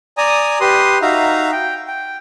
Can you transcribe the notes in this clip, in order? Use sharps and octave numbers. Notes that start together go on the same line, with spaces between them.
D5 G#5 A#5 D#6
G4 B4 C6 D#6
D#4 F#4 E5 F5 A#5
G5
G5